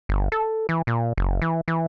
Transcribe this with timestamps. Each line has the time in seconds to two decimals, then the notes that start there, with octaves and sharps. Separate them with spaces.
0.09 G1
0.32 A4
0.69 E3
0.87 A#2
1.18 F#1
1.42 E3
1.68 E3